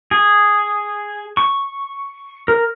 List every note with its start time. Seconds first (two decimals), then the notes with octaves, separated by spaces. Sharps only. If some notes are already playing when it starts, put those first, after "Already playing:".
0.11 G#4
1.37 C#6
2.48 A#4